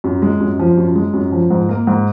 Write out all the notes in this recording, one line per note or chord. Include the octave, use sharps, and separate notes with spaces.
F#2
G#3
F#2
F3
F#2
G#3
F#2
F3
G#2
A#3
G#2